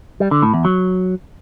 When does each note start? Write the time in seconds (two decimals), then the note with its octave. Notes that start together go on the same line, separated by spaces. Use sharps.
0.20 G3
0.31 D3
0.42 A2
0.54 E2
0.65 F#3